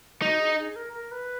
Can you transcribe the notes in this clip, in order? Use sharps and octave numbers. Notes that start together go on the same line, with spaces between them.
D#4 F#4
G#4
G#4
A#4
A#4
B4